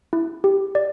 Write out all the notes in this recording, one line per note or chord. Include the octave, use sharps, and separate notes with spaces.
E4
G4
D5